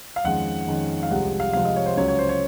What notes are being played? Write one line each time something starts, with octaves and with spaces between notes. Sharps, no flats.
F5
F2 D#3 G#3 C#4 F#5
F2 D#3 G#3 C#4
F5
C2 C3 F3 G#3 F#5
F5
C2 C3 F3 G#3 F5
D#5
C#5
C5
C#2 C#3 F#3 C#4 C#5
C#5
C5
C#5